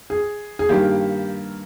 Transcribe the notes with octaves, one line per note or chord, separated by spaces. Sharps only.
G#4
G#4
G2 D#3 A#3 G4